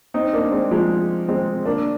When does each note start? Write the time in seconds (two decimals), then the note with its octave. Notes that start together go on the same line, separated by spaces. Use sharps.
0.14 C4 D#4
0.33 A#3 D4
0.52 G#3 C4
0.71 F3 G#3
1.28 G#3 C4
1.65 A#3 D4